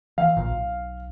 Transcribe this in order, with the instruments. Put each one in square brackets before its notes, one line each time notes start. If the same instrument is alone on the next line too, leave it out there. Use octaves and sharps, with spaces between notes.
[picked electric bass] E3 [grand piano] F5
[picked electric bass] A#1 A#2
B1